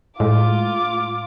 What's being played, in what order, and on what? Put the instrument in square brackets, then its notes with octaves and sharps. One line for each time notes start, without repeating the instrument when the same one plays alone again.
[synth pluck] A2 G#3 [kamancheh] F4 D6